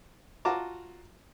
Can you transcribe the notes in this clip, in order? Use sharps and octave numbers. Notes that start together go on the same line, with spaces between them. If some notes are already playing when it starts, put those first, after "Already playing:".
F4 F#4 A5 A#5 D6